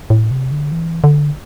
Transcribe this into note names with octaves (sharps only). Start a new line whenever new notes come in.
A2
C3
D3
E3
D3